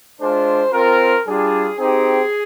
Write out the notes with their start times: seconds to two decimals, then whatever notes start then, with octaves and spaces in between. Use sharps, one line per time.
0.20 G#3 D4 F4 C5
0.72 C4 F4 A#4
1.25 G3 D4 F4 G#4
1.78 C4 D#4 G4 G#4